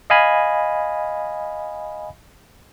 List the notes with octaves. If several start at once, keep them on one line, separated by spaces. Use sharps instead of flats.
D#5 F5 G#5 B5